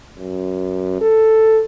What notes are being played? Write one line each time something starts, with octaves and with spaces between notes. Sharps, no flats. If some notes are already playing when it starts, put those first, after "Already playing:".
F#2
A4